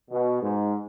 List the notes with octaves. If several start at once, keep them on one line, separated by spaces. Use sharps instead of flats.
B2
G#2